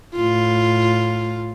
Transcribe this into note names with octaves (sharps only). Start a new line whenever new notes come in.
A2 F4